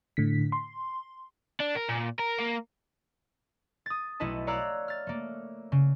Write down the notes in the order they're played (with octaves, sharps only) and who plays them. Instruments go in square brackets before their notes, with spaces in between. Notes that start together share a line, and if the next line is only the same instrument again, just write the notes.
[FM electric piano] A2 D3 B6
C6
[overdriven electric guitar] D4
A#4
A#2
A#4
A#3
[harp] D#6 A6
B1 A3 E4 B4 D#5 A5
C#5 D5 F5 A#5 E6 F#6
F6 A6
A3 A#3
C#3